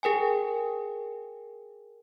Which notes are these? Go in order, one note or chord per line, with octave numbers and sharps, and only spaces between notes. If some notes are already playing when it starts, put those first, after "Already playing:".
G#4 A#4 G5 G#5